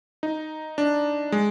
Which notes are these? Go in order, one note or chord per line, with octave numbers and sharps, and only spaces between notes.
D#4
D4
G#3